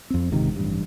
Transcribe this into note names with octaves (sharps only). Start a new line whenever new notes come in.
F2 C4
G#1 G#2 C3 D#3
A1 G2